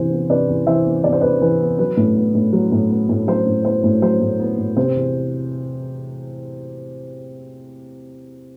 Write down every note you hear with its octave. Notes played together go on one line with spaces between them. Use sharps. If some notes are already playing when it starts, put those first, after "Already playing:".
Already playing: E2 C3 E3 B3 C5
B3
C3 B4 D5
E2
E3 C5 E5
B3
C3 D5
C5
E2 B4 D5
E3 B4
B3
F#3 B4
A2
B3
A2
F#3
A2
B3
A2
F#3 C5
A2
B3 C5
A2
F#3 C5
A2
B3
A2
C3 C5
E2